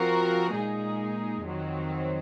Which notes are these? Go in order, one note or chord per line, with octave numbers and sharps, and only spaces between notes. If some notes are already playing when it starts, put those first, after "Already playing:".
Already playing: F3 C4 F#4 A#4
A#2 G#3 D#4 G#4
F2 D#3 F#3 C4